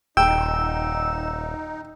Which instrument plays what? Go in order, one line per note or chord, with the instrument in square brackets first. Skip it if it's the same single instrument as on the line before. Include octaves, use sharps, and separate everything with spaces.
[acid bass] D#1 [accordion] D#4 [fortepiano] G5 [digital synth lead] E6